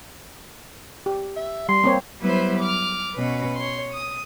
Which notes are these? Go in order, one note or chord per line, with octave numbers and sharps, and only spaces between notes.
G4
E5
G3 C6
A#3 C4 C#5
F#3 G3 B3 E4 B4 C5
D6 F6
B2 C#4 B4
C#5 C6
D#6